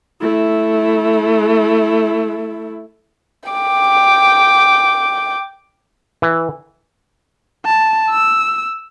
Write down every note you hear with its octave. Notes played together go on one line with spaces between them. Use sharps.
A3 E4
G5 D6
E3
A5
E6